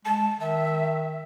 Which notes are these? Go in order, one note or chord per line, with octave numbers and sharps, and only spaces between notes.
G#3 A5
D#3 E5